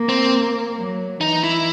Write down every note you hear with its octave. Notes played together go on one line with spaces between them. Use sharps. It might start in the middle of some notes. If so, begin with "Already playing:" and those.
Already playing: A#3
C4
F#3
E3 D#4
E4